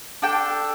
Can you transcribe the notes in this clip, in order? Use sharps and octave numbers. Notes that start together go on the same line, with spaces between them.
D4 A4 G5